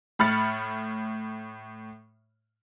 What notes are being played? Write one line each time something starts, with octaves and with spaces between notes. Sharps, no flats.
A2 B5 F6 A6 C#7